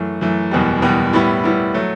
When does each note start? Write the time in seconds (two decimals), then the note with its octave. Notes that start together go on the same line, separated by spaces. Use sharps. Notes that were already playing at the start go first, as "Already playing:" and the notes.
Already playing: F#2 E3 A3
0.21 F#2 E3 A3
0.51 F#1 E2 B2 G3
0.82 F#1 E2 B2 G3
1.13 A2 G3 B3 E4
1.44 A2 G3 B3 E4
1.74 F#3 A3